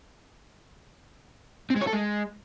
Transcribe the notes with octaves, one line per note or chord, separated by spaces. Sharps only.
C4
G#3
C#5
A4
G#3